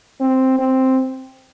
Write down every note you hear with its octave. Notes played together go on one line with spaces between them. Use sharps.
C4
C4